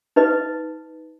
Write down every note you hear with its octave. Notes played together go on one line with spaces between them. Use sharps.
D#4 B4 D#5